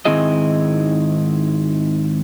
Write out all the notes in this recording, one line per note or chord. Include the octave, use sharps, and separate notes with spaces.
G#2 D#3 C4 E4 G#4 D#5